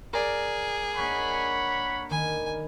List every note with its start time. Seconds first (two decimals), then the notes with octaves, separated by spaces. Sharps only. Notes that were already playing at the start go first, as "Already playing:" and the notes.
0.13 G#4 A#4 D5
0.96 G#3 A#3 D4 C#5 F#5 B5
2.10 D#3 G#5 B5